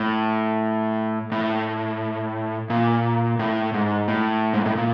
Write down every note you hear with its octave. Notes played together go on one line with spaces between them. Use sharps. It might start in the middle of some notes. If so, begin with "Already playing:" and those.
Already playing: A2
A2
A#2
A2
G#2
A2
G#2
A2
A#2